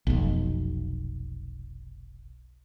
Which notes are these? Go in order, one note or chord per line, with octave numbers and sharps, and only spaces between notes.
F1 B1